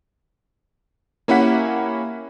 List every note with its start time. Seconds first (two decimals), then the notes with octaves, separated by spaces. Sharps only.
1.28 A#3 C#4 E4 G4 F#5 B6